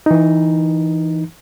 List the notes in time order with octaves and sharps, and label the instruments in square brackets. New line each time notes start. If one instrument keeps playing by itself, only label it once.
[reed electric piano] E3 D#4